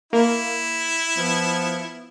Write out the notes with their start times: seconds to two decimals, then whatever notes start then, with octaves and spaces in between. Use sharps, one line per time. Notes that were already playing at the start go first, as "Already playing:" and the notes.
0.13 A#3 E4
1.17 F3 B3